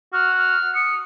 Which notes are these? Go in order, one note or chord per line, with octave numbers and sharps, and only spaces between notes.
F#4 F6
F6
D#6 C#7